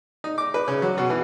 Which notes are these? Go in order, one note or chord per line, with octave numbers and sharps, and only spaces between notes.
D#4
D6
B4
C#3
F#3
B2
E3